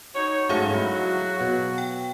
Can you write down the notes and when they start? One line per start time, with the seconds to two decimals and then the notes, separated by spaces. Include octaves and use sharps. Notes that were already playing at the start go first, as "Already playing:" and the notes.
0.15 D#4 F#4 C#5
0.49 G#2 F#3 A3 C#4 F#4 G#4 C#5 F5
0.75 D#4 E4
1.41 B2
1.78 G5